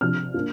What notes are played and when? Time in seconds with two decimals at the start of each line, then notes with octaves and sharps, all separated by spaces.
0.01 C3 F3 D4 F6
0.34 A#3 D4 F4